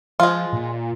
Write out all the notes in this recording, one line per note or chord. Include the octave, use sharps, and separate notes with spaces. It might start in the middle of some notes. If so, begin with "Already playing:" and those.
F3 G#3 F4
A#2